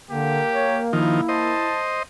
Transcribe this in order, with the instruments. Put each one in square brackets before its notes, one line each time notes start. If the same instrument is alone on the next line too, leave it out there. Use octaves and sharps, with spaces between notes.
[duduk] D3 [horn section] A#3 [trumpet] G4
[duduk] C#5
[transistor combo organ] D#3 F3 [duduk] E4
[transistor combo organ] C5 D#5 [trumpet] A5